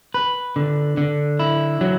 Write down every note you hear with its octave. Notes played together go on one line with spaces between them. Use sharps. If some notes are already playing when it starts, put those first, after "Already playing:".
B4
D3
D3
E4
F#3